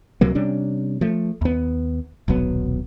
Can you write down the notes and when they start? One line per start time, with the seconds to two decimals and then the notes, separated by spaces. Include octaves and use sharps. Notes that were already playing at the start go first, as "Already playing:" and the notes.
0.21 C#2 C3 F#3 A#3
0.35 C3 G3 C#4 D4
1.01 F3 A3
1.41 D#2 B3
2.28 D#1 B1 F#3 B3